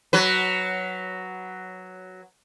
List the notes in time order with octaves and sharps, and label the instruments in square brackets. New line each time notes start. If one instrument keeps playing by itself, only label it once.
[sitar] F#3 B4